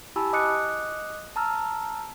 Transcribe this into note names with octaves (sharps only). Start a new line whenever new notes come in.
E4 G4 G#5 A5 B5 E6
D#5 D6 D#6 F#6 C#7
A5 A#5 E6 F6